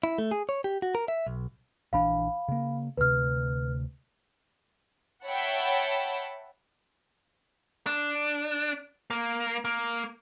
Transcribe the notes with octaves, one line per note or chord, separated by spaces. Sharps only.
E4
A3
G#4
C#5
G4
F#4
A#4
E5
B1
A#1 E3 D4 F5 B5
C#3 A#3
D2 C3 B4 F6
C#5 E5 F#5 G5 A5 B5
D4
A#3
A#3